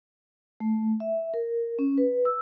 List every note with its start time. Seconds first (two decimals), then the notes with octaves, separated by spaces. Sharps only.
0.60 A3
1.00 E5
1.34 A#4
1.79 C#4
1.98 B4
2.25 E6